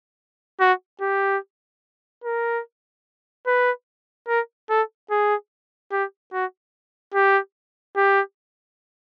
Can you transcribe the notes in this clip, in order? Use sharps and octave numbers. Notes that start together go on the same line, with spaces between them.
F#4
G4
A#4
B4
A#4
A4
G#4
G4
F#4
G4
G4